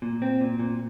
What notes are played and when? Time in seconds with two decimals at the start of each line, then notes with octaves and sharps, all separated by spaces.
0.02 A#2
0.22 C4
0.41 A#2
0.59 A#2